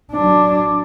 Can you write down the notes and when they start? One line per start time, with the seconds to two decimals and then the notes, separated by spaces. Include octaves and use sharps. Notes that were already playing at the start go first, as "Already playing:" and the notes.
0.12 F#3 D4